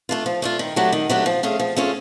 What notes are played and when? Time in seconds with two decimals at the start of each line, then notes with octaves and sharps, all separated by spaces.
0.09 A3 D4 F4
0.26 F3
0.42 A3 D4 F4
0.59 D#3
0.76 F#3 A3 D4 G4
0.92 D#3
1.09 F#3 A3 D4 G4
1.26 F3
1.43 A3 C#4 F4 G#4
1.60 F3
1.76 A3 C#4 F4 G#4